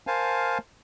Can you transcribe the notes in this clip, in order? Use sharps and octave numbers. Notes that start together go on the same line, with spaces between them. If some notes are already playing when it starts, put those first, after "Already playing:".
A#4 C5 F5 G#5 A5